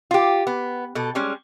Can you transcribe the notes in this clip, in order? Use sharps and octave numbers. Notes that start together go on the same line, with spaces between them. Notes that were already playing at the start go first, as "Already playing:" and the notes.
F4 G4
B3
B2 A4
G3 G#3 C#4